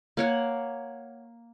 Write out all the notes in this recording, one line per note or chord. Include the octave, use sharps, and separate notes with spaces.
A#3 C#5 F#5